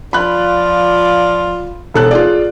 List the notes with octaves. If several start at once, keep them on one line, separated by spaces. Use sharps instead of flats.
F3 F4 D5 B5 F#6
E1 A4 F#6
F4 G#4 D5